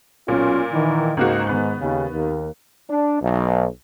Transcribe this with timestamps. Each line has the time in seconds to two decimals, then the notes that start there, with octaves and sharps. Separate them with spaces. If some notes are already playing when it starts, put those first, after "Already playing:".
0.28 B1 A#2 C#4 F4
0.72 D#3 E3
1.17 C#2 G#2 A#3 F#4
1.47 D#3 B3 F#6
1.80 D#2 C#3
2.13 D#2 A#3
2.90 D4
3.21 B1